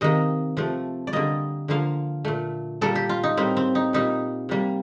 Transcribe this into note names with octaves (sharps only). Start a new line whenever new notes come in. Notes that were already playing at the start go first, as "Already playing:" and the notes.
C3 D#3 A#3 D#5
C3 F3 A3
D5
D3 G3 A#3 D#5
D3 F3 A#3 F5
A#2 A3
A#2 G3 A#3 A4
G4
F4
D#4
A2 G3 A#3 C4
C4
D#4
A#2 G3 A#3 D#4
C3 G3 A#3